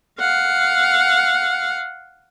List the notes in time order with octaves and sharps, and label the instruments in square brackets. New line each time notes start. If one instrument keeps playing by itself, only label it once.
[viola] F5 F#5